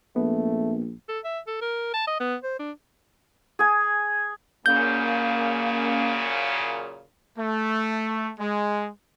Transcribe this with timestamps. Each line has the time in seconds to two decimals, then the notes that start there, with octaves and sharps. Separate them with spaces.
0.16 A#1 A3 B3
1.08 A4
1.24 E5
1.47 A4
1.62 A#4
1.94 A5
2.07 D#5
2.20 B3
2.43 C5
2.59 D4
3.59 G#4 G#5
4.66 F#2 A#2 C#3 A#3 C#4 G6
7.38 A3
8.39 G#3